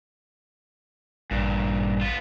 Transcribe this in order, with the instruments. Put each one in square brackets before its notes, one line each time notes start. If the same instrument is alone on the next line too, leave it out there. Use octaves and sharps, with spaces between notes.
[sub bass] A1 [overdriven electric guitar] G2 A#2
[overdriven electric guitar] B3 F4